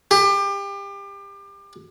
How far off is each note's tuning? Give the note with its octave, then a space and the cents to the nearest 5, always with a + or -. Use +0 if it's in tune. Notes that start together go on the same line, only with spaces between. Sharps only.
G4 +30